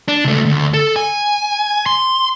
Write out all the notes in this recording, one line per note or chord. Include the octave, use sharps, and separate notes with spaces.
D4
C#2 A3
D2
A4
G#5
C6